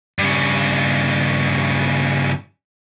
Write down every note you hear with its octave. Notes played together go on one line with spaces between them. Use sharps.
G2 C#3